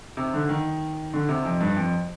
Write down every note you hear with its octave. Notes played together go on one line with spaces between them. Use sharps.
C3
D3
D#3
D3
C3
F2
G2
F2